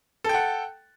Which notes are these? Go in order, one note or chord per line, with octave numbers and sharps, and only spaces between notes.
A4 F#5 G5